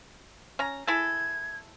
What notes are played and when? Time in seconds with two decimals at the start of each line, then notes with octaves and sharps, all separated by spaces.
0.59 C#4 A#5
0.87 E4 G#4 A4 G#6